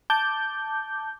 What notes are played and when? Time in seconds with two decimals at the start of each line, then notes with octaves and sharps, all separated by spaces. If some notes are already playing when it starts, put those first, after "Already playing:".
0.10 A5 D6 G6